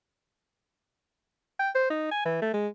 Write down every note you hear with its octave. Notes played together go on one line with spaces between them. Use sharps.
G5
C5
D#4
G#5
E3
A3
G#3